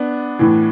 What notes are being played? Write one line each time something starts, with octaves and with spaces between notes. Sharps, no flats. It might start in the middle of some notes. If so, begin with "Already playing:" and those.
Already playing: B3 D4
A2 E3